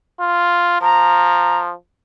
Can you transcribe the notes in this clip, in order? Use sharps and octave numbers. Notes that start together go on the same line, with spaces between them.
F4
F3 A#5